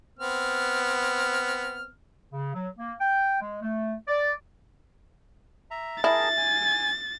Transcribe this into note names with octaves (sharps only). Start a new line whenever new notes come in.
B3 C4 F6
C#3
F#3
A#3
G5
G#3
A3
D5
E5 A#5
E4 G#4 A#4 A5 A6
G#5